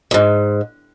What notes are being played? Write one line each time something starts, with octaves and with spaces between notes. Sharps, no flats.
D2 G#2